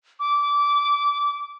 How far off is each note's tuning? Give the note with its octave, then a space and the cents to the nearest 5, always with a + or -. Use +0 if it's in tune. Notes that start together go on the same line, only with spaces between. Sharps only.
D6 -20